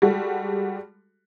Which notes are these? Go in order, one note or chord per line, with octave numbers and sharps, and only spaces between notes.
G3 G#3 F#4 G4 A4